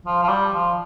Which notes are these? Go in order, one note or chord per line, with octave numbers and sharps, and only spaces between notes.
F3
F3
G3
F3